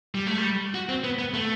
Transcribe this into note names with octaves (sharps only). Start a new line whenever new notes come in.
G3
A3
G3
F#4
C4
B3
B3
A3